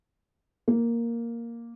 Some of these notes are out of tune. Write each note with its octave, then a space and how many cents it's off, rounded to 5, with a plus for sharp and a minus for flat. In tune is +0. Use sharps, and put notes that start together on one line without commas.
A#3 +0